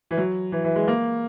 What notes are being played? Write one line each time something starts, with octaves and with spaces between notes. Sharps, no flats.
E3
F#3
E3
E3
G#3
A#3